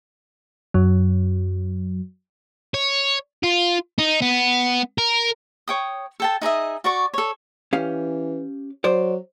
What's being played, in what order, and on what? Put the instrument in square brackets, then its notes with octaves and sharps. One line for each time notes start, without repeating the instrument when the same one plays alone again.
[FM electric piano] F#2 F#3
[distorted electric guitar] C#5
F4
D#4
B3
A#4
[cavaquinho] C#5 G5 D#6
A4 G5 A5
D#4 G#4 D#5 E5
F#4 D5 C#6
A4 C#5
[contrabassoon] E3 [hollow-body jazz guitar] C#4 G4 F5
[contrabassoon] F#3 [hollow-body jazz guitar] C5 D5